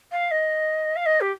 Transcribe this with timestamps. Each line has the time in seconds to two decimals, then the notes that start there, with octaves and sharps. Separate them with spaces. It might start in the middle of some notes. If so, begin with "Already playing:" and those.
0.11 F5
0.30 D#5
0.96 F5
1.05 D#5
1.20 G4